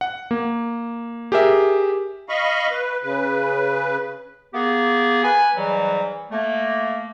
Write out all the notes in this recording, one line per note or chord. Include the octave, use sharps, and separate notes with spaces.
F#5
A#3
G4 G#4 A#4 E5
D#5 F5 B5 C#6
B4
C#3 B4
A#3 B3 G4 G#4
B4 G#5
G#2 E3 F#3 G3
A3 A#3